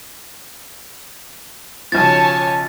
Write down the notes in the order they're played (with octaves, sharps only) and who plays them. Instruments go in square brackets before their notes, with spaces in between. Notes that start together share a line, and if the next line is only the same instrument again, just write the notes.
[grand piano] B1 C#3 F3 [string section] C#5 G#5 A5 [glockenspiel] A6